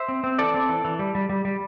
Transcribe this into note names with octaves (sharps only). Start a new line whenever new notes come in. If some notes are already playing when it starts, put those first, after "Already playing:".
Already playing: C5 E5
C4
C4
E3 A4 D5
C4
E3
E3
G3
G3
G3
G3